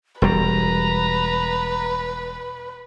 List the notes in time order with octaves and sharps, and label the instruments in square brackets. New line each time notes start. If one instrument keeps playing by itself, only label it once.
[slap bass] E1 G3 [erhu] B4 [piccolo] A#5